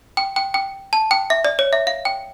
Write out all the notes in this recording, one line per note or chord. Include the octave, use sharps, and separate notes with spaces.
G5
G5
G5
A5
G5
E5
D5
C#5
E5
F5
G5